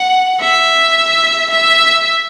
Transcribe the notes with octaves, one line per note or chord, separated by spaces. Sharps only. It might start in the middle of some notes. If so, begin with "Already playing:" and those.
Already playing: F#5
E5
E5